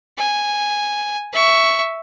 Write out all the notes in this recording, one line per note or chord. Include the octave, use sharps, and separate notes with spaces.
G#5
E5 C#6